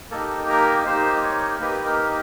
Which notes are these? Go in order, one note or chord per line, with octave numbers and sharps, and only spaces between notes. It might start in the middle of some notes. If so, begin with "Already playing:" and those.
A#3 D#4 G4 A4
A#4
A#3 D#4 G4 C5
C#5
A#3 D#4 G4 B4
A#4